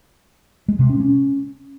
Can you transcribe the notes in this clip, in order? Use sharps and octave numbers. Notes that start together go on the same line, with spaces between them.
G#3
C3
C#4
C#4